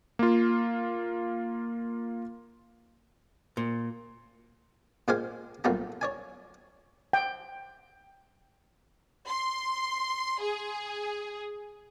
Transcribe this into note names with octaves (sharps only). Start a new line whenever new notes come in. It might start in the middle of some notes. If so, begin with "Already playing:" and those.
A#3 F4
A#2
A#2 G#3 G4 C5 F5 G#5
B1 A#2 G3 A3 G4 A#5
C#5 D5 G#5
G5
C6
G#4